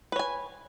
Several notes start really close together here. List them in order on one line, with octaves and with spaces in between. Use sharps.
B4 C#5 G#5